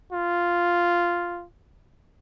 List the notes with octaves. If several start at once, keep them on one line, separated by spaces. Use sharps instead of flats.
F4